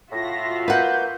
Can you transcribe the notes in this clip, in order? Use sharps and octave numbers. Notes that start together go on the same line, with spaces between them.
A2 F4 F#4 E5 A#6
A#3 B4 F#5 G6